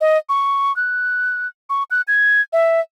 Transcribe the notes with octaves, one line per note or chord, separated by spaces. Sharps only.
D#5
C#6
F#6
C#6
F#6
G#6
E5